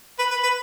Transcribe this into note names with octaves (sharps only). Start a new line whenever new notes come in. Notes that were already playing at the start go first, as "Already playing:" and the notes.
B4
B4
B4